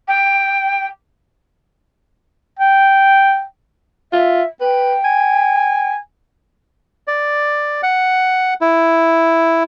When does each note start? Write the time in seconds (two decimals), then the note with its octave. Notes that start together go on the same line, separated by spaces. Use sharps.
0.08 G5
2.59 G5
4.13 F4 E5
4.61 B4 G5
5.05 G#5
7.08 D5
7.83 F#5
8.61 E4